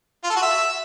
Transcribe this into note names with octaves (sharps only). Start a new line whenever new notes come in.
F4
A4
F#4
E5